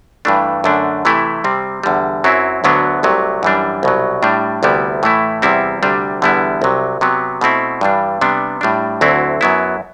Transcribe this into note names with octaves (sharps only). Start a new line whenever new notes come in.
G2 E3 A3 D4
F#2 D3 A3 D4
C3 E3 A3 E4
C3 G3 C4
E2 D3 G3
F#2 F#3 C4 E4
D2 D3 F#3 B3 D4
C2 C3 F#3 A3
F#2 E3 G3 D4
C2 B2 F#3
A2 G3 D4
D2 C3 G3 B3 E4
A2 E3 A3 E4
E2 C3 G3 C4 E4
D2 C3 G3 D4
E2 D3 G3 B3 E4
C2 C3 F#3
C3 F#3 B3
B2 A3 C4 E4
G2 E3 G3 D4
C3 G3 B3 D4
A2 G3 D4
D2 D3 F#3 C4 E4
F#2 F#3 B3 E4